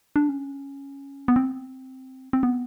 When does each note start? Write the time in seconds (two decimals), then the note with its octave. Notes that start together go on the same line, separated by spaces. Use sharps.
0.16 D4
0.29 C#4
1.28 B3
1.36 C4
2.33 C4
2.43 B3